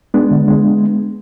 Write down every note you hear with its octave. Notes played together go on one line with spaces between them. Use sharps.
G#3 B3 D4
D3
G#3